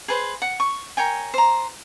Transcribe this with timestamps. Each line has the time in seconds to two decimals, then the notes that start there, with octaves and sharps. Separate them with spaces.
0.08 G#4 B4 C5
0.42 F#5
0.60 C#6
0.97 A#4 C#5 G5 G#5
1.34 C5 A#5